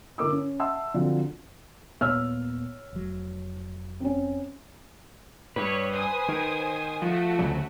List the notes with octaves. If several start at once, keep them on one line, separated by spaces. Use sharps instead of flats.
D3 E4 A#4 D6 E6
C#4
D#5 E5 F#5 A5 C6 E6
D3 F3 F#3 C4
D#1 A#2 B3 C#5 E6 F6
F1 F#3
C4 C#4
G2 B4 C#5
C5 G#5 D#6
D#3
F3 A3 F#4
D2 C#3 F#3